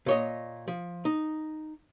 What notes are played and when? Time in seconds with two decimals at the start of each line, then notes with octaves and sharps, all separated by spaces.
0.06 A#2 C#5 D#5
0.68 F3
1.05 D#4